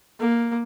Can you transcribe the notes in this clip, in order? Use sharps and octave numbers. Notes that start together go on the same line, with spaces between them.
A#3